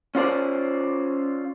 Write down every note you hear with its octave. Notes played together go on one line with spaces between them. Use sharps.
C#4 F4 C5 D5